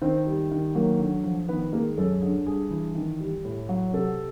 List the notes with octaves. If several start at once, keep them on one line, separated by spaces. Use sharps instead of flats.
D#3 C4 C5
G3
D#3
F#3 A#3 A#4
D3
F3
D#3 B3 B4
G#3 A#3 A#4
F#2 A4
D3 G#4
G2 G#4
E3
D#3
G3
A2
F#3
C3 A4